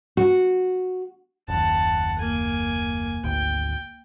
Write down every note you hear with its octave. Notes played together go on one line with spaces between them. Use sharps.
F#4
F#1 D#2 F#5 A5
A#3 G#5
G#1 D2 G5